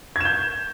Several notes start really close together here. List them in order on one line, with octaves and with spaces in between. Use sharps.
G#6 E7 G6